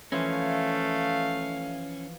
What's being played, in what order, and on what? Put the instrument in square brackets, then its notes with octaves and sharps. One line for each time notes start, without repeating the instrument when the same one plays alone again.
[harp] E3 F3 [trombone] A3 [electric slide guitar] C#4 [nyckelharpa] F5